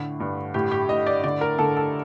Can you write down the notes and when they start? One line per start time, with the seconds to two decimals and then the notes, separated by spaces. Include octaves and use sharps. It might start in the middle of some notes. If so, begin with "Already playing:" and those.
Already playing: A2 D3
0.20 G2
0.54 A2 G4
0.71 G4
0.89 A2 D#5
1.07 D5
1.24 D3 D5
1.41 A#4
1.59 D3 A4
1.77 A4